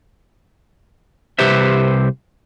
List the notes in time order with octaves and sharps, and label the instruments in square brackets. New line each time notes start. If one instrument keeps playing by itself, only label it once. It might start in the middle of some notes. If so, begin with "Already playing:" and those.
[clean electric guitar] C2 G4 B4 C5 E5